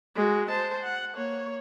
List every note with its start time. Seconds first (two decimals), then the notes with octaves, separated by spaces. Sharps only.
0.15 G#3 F#4
0.50 C5 A5
0.83 F#5
1.15 A#3 C#5